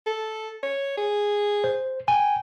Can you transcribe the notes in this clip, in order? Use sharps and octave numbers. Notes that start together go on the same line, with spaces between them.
A4
C#5
G#4
C5
G5 G#5